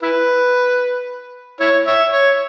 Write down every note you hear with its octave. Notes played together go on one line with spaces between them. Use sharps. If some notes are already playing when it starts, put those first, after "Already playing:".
E4 B4
E4 C#5
C#5 E5
C#5